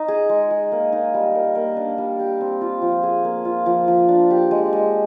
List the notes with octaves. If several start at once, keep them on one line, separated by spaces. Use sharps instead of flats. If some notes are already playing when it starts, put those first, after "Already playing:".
Already playing: D#4
G#4
G#3
G#3
A#3
D#4
G3
A#4
A#3
D4
G3
G4
C4
F4
F3
G#4
A#3
F4
F3
F3
D4
G4
G#3
G#3